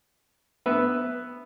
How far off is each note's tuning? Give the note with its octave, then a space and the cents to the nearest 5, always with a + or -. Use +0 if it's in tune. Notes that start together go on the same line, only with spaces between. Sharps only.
B3 +0 B4 +0 E5 +0